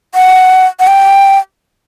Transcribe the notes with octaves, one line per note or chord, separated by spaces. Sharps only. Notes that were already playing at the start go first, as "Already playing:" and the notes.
F#5
F#5
G5